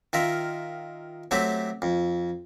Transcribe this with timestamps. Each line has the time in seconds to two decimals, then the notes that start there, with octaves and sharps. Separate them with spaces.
0.13 D#3 F4 A#4 E5
1.31 F#3 A3 C4 G4 E5
1.82 F2